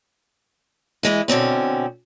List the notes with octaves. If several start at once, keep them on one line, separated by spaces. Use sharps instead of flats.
E3 G#3 E4
B2 D3 C4 C#4